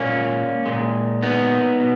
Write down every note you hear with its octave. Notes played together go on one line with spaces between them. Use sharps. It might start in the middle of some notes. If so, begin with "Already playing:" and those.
Already playing: A#2 G#3 A#3 C#4
A#2 G#3
B3 D#4
B2